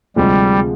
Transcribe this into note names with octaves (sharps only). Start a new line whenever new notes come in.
D2 C3 F3 G3 G#3